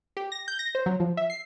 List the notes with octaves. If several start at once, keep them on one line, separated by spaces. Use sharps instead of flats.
G4
A#6
G6
A#6
C5
F#3
F3
E5
C7